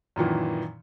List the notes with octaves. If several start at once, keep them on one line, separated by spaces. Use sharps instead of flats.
F#2 A#2 D#3 E3